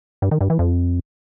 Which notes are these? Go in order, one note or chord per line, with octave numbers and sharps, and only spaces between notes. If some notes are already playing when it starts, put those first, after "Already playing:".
G2
D#3
G2
E3
F2